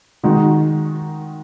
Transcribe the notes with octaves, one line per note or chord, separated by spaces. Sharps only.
D#3 G#3 D#4 F#4